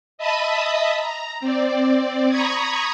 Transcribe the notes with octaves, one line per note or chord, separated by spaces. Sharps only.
D#5 E5 A5 B5 D#6
A#5
C4 D5
A#5 B5 C#6 D#6 G#6